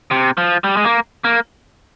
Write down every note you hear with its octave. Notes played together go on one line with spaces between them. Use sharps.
C3
F3
G3
G#3
A#3
A#3